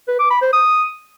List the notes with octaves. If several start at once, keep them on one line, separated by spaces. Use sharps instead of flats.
B4
D6
B5
C5
D#6